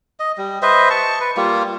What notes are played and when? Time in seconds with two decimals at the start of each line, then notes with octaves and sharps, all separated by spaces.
0.20 D#5
0.38 G3
0.62 B4 C5 D#5 E5
0.90 A5 C#6
1.21 B4
1.37 G3 A#3 F4